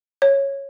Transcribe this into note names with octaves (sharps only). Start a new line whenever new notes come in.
C#5